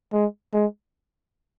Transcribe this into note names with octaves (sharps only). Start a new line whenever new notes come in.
G#3
G#3